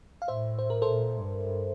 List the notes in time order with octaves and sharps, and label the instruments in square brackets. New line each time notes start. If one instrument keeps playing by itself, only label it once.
[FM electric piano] F5
[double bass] A2 [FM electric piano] C5 E5
[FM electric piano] C5
A#4
A4 C5
[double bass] A#2
G2